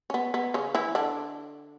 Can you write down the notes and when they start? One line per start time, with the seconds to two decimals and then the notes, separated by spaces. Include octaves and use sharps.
0.10 C#4
0.14 B3
0.34 B3
0.54 C#3 C#4
0.75 E3 E4
0.95 D3 D4